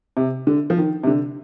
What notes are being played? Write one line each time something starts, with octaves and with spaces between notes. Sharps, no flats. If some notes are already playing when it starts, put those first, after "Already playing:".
C3
D3
F3
D#3
C3
D3